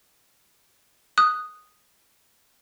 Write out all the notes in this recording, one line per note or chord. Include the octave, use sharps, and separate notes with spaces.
D#6 F#6